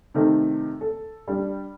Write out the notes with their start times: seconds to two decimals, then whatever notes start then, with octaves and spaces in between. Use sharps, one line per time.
0.14 C3 D#3 A3 C4 D#4
0.81 A4
1.27 G3 D4